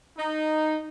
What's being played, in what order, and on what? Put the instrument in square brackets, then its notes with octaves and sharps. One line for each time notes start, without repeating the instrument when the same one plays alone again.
[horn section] D#4